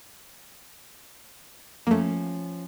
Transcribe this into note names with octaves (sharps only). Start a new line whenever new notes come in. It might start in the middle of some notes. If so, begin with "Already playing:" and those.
F3 A3 A#3 C#4